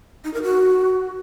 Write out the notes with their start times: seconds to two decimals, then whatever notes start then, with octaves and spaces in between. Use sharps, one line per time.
0.24 D#4
0.34 A#4
0.43 F#4